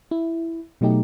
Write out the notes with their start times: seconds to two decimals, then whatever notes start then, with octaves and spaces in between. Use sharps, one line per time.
0.11 E4
0.81 B2 F#3 A3 D#4 G4